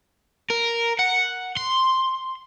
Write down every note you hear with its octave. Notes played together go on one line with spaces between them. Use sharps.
A#4
F#5
C6